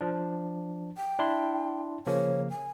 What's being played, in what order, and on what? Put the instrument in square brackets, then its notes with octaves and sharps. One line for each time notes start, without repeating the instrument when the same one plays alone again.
[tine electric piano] F3 D4
[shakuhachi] G5
[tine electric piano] D4 E4 C6
[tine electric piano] C#3 F3 A#3 [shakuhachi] C#5
[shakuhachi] G#5